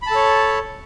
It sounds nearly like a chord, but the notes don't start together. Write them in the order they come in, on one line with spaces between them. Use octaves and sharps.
B5 A5 A4 C#5